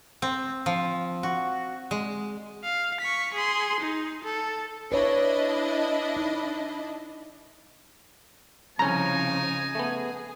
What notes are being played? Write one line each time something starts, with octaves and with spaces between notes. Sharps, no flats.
C4
F3
F#4
G#3
F5
C#6 B6
G#4 C6
D#4
A4
D4 E4 B4 C#5 D#5
D#4
C2 C#3 F3 C#4 D#4 G#5 A#5
A3 B3 G#4